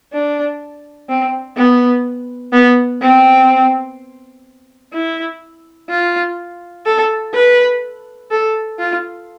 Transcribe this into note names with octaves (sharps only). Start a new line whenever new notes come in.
D4
C4
B3
B3
C4
E4
F4
A4
B4
A4
F4